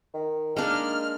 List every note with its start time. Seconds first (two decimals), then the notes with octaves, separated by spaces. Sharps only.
0.14 D#3
0.57 G#3 A#3 D4 D#4 F6